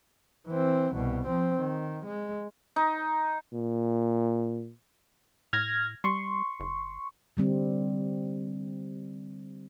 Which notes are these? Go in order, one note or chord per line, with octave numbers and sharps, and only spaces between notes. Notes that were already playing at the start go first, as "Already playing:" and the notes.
E3 C4
C2 B2
F3 C4
D#3
G#3
D#4
A#2
A2 F6 G#6 A#6
G3 C6 C#6
F#1
D3 G3 C4